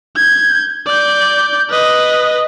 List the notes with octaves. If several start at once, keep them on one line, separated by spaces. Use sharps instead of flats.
G6 G#6
D5 G6
B4 D#5